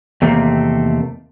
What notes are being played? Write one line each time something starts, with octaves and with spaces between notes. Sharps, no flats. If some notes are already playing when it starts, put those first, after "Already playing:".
E2 C3 D#3 A3 A#3 C4